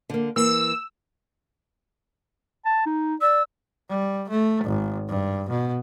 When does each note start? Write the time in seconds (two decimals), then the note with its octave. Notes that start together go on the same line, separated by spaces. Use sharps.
0.10 D3 A#3
0.36 E3 A#3 E6
2.65 A5
2.86 D#4
3.21 D5 E6
3.89 G3
4.30 A3
4.65 G#1
5.09 G2
5.49 B2